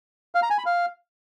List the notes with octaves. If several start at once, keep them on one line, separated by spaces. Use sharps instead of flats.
F5
A#5
G#5
B5
F5